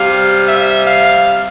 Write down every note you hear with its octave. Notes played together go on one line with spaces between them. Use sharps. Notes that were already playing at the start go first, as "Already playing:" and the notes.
Already playing: C3 G3 F5
E5
F5